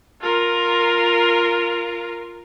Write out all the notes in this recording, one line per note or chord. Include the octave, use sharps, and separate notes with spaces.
F4 A#4